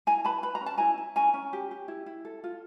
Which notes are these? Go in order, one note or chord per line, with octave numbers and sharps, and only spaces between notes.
E4 G#5 A#5
B4 A5 B5
B4 B5
A#5
C#4
A5
E4 G#5 A#5
E4
C#4 G#5 A#5
C#4
G4
G4
E4
E4
A4
F4